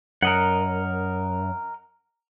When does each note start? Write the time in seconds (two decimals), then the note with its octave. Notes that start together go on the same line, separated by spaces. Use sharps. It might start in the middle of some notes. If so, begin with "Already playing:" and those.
0.22 F#2 A#4 D#5 F#5